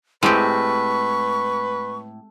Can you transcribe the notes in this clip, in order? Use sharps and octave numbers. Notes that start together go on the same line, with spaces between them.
A2 G#3 C4 G4 B4 C#6